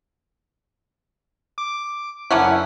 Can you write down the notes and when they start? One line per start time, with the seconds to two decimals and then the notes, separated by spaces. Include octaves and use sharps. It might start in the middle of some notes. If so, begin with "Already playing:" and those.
1.58 D6
2.31 F#1 D3 A#3 C#4 E4 F#5